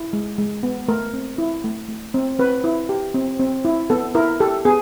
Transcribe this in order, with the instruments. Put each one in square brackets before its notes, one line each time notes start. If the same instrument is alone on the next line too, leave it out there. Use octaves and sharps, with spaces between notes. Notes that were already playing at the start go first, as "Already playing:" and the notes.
Already playing: [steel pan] E4
G#3
G#3
B3
A3 A#4
C4
E4
A3
A3
C4
C4 B4
E4
G4
C4
C4
E4
B3 A4
E4 A#4
G4 A4
B3 G#4